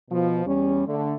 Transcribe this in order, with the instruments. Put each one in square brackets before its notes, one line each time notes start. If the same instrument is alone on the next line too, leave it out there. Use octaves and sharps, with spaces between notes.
[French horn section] B2 F3
E2 G3 C#4
D3 A3